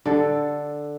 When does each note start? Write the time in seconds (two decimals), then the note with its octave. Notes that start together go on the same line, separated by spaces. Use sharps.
0.06 D3 A4